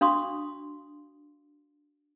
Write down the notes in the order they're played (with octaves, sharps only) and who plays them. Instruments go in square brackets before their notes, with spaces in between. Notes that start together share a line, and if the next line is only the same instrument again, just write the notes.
[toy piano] D4 F#4 F5 C6 C#6 D#6